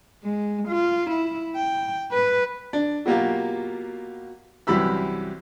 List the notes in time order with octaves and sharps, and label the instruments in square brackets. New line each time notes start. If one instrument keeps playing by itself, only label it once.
[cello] G#3
F4
E4
G5
B4
[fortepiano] D4
B2 F#3 A#3 F4 G4
C2 F#2 E3 G4 B5 E6